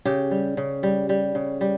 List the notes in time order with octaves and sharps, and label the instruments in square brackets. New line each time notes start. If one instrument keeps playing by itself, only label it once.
[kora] C#3 G4
G3
C#3
G3
G3
C#3
G3